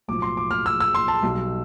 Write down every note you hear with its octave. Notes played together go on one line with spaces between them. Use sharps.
B1 A2 F3 D6
C6
D6
F6
E6
E6
C6
A5
B1 B2 G3